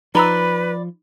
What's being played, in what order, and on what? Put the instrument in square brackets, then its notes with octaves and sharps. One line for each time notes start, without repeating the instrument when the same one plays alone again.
[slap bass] F3 [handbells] D#4 A#5 E6 [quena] B4 [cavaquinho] D5 B5